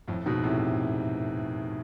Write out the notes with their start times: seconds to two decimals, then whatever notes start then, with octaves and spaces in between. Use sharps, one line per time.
0.08 F2 A2
0.26 G#2 B2
0.44 A2 C3